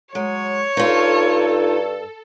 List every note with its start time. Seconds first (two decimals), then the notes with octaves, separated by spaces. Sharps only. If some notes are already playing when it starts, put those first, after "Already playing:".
0.15 F#3 G#3 C#5
0.77 G2 D#4 F4 A4